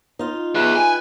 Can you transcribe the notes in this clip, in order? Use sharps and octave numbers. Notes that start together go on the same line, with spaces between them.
D#4 F4
G#4 B4 E5
G#5